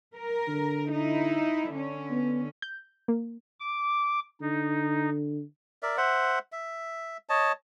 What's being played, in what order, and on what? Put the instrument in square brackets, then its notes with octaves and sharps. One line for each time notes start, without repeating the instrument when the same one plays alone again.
[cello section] A#4
[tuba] D3
[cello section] D#4 E4
D3 C#4
[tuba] B3
[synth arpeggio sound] G6
A#3
[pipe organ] D6
[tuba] D3 [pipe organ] D#4
[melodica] A#4 D5 E5
C5 E5 F#5
E5
C#5 D#5 A5